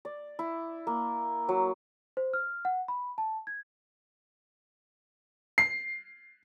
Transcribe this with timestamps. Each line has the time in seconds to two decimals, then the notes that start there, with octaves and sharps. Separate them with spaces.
0.05 D5
0.39 E4
0.87 A#3
1.49 F#3
2.17 C5
2.34 F6
2.65 F#5
2.88 B5
3.18 A5
3.47 G#6
5.58 C7